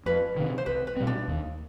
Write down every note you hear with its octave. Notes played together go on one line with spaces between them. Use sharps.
F2 B4
C3 D#3
C5
C2 B4
B4
B2 G3 C4
D4
D#2